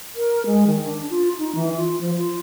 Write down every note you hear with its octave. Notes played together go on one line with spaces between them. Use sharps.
A#4
G#3
D#3
D4
F4
D#4
E3
F4
F3
F4